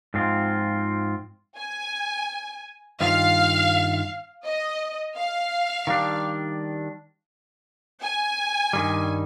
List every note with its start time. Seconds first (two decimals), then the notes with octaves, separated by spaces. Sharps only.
0.14 G#2 F3 C4 F4
1.57 G#5
3.00 G2 D#3 F4 F5
4.45 D#5
5.16 F5
5.87 D#3 G3 D4
8.03 G#5
8.73 G2 D#3 G3